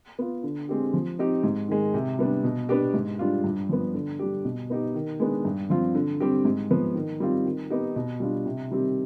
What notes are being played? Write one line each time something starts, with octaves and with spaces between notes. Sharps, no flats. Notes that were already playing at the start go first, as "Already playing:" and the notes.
B3 F4
D3
G#3 C4 G4
F3
C4 D#4 G4
G#2
D#3 G#3
C3
G3 B3 D4
B2
B3 D4 G4
G#2
G3 D4 F4
G2
F3 B3
D3
G3 D4 G4
B2
B3 D#4 G4
D#3
G#3 B3 D4
G2
F3 C4 F4
D3
G3 C4 G4
G#2
F3 B3
D#3
G3 C4 F4
D#3
B3 D#4 G4
B2
G3 D4 F4
C3
D#3 G3 C4 G4